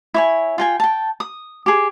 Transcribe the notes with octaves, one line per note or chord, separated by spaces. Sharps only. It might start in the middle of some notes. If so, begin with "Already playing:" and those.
E4 C#5 G#5
F4 G5 G#5
G5 A5
D#6
G4 G#4